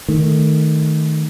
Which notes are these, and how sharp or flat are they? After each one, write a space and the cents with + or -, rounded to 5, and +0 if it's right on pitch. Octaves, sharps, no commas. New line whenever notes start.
D#3 +0 A3 +0